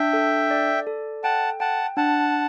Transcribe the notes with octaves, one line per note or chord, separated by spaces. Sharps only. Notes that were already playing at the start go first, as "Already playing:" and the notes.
Already playing: D4 E5 G5
A4
D5
A4
F#5 G5 A5
F#5 G5 A5
D4 F#5 A5